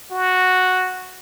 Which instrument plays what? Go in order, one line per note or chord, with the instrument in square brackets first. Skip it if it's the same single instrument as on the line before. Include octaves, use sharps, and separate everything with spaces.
[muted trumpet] F#4